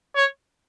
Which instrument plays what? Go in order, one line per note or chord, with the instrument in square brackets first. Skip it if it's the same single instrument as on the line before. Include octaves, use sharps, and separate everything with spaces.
[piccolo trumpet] C#5